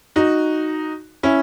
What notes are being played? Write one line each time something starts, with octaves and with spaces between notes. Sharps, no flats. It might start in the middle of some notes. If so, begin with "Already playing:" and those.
D#4 F#4
C#4 E4